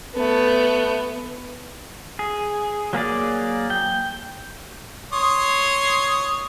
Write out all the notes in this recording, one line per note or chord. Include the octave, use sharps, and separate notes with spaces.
A3 B3
G#4
F#3 A#3 G#4 D5
G5
C#5 C6 D#6